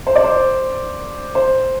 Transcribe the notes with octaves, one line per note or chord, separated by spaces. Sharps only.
C5
D5
C5
C5